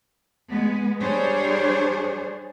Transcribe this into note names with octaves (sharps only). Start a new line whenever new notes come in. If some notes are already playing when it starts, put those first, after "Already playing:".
G#3 B3
G3 D4 G#4 C5 C#5